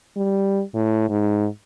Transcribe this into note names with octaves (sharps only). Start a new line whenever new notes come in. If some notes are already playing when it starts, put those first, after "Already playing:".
G3
A2
G#2